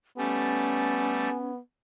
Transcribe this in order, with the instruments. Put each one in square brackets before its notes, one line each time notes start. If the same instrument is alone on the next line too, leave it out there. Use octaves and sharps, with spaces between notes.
[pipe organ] G3 A3 [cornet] B3 [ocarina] C#4 [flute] G#5